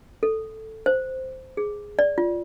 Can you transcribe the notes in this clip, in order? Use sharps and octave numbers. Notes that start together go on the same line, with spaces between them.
A4
C5
G#4
D5
F4